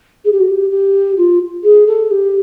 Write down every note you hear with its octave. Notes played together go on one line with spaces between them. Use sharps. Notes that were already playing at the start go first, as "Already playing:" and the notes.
G#4
G4
F#4
G4
G4
F4
G#4
A4
G4